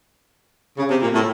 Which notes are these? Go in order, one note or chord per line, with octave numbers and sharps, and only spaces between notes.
C#3
C3
A#2
A2